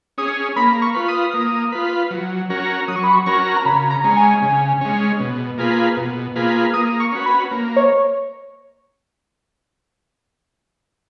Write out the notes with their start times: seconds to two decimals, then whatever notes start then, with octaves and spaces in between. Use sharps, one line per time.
0.18 C#4 G#4 D#6
0.56 A#3 B5
0.82 C#6
0.94 F4 B4
1.08 D#6
1.34 A#3
1.72 F4 B4
2.11 F#3
2.50 C#4 F#4 A#4
2.88 F#3 D#6
2.96 C#6
3.04 B5
3.13 C#6
3.26 C#4 F#4 A#4 C#6
3.56 A#5
3.65 C#3 B5
3.90 A#5
4.04 G#3 C#4
4.17 G#5
4.42 C#3
4.81 G#3 C#4
5.20 B2
5.58 A#3 F4 G#4 B4
5.97 B2
6.35 A#3 F4 G#4 B4
6.74 A#3 D#6
7.00 C#6
7.12 C#4 F#4 B4
7.26 B5
7.51 A#3
7.76 C#5